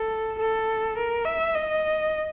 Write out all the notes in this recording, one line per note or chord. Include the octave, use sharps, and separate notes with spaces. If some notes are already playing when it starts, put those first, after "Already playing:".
Already playing: A4
A4
A#4
E5
D#5